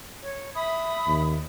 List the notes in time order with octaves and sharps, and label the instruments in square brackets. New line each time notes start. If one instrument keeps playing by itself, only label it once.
[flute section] C#5
E5 B5 D#6
[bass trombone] D#2